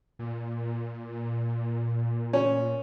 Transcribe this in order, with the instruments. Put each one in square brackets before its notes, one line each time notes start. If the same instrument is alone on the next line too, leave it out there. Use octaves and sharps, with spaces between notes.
[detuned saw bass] A#2
[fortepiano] C#4